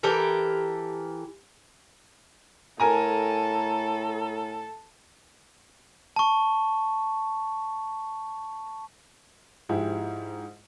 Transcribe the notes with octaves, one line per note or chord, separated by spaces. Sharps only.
E3 G4 A4 A#4
A2 A4 A#4 G#5 A#5
A5 C#6
G#2 F3 E4 G4 G#4